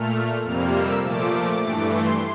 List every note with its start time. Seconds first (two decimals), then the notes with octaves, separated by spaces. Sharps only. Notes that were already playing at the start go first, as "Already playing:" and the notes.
Already playing: A#2 A3 F6
0.43 F2 C3 G3 A#3 F6
0.72 E6
1.02 A#2 F3 A3 D6
1.61 G2 E3 A3
1.91 C6